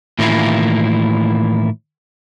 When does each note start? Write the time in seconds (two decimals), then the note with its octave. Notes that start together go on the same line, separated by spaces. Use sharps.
0.19 A2 D#3 E3 A#3 E4 F4